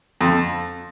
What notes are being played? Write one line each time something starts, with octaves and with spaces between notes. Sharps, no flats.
F2